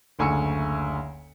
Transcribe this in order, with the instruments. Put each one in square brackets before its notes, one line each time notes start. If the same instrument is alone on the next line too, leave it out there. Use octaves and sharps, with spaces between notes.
[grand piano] F#1 D2 G#5 C#6 E6 C#7